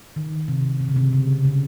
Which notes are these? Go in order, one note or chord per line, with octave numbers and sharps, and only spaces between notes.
D#3
C3
C3
C#3
C3
C#3
C#3